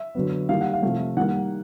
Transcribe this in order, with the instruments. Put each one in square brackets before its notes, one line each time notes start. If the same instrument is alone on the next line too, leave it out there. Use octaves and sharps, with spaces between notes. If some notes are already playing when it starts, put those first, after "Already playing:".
Already playing: [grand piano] E5
D3 F#3 B3
D#3 G3 A#3 F5
F#5
F5
C3 F3 A3
D#3 G3 A#3 F#5